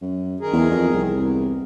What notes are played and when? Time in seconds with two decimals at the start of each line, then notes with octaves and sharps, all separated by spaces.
0.02 F#2
0.40 D#3 G#4 A#4
0.53 E2
0.71 F2
0.93 C2
1.10 E2